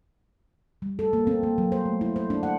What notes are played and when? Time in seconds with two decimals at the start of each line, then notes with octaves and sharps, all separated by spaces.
0.82 G3
0.99 A4
1.13 A#3
1.27 C4
1.43 A#3
1.58 F#3
1.72 C5
1.86 A3
2.01 E4
2.16 C5
2.30 D4
2.43 F#5